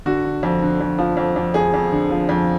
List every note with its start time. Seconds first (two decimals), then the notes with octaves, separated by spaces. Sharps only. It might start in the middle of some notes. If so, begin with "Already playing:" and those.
0.06 D3 F#4
0.25 D3
0.43 F2
0.62 D3
0.81 F2
0.98 F3
1.17 F2
1.36 F2
1.54 F2 G#4
1.74 F2
1.92 D3
2.11 F3
2.29 F2